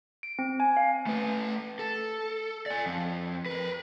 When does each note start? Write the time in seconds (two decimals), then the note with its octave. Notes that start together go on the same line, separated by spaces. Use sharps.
0.23 D7
0.39 C4
0.60 G#5
0.77 F5
1.07 A3 B4
1.79 A4
2.66 D5 G#5
2.86 F2
3.46 A#4 B4